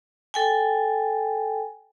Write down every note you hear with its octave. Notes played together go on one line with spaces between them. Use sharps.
A4 G5 G#5